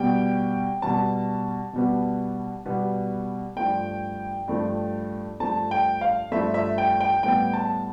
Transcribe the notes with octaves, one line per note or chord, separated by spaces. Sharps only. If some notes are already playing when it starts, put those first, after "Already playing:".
Already playing: B2 G3 B3 G5
B2 G3 B3 A5
B2 G3 B3
B2 G3 B3
G2 F3 A3 G5
G2 F3 A3
G2 F3 A3 A5
G5
F5
G2 F3 A3 E5
E5
G5
G5
A2 G3 B3 G5
A5